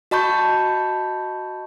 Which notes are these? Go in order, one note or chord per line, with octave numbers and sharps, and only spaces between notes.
F#4 D#5 A5 B5 C#6 G6